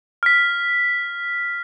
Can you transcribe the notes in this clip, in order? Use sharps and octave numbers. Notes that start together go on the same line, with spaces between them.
F6 B6